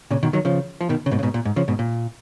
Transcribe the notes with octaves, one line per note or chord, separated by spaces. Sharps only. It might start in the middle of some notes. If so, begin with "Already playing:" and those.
A#2 C#3
B2 D#3
D#3 F#3
C#3 F3
F3
B2 D#3
C#3
G#2 B2
C#3
G#2 B2
A#2
G#2
C#3 F3
G#2 B2
A#2